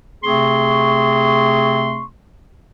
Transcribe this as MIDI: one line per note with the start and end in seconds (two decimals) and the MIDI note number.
0.24 2.04 48
0.24 2.04 57
0.24 2.04 60
0.24 2.04 68
0.24 2.04 84
0.24 2.04 85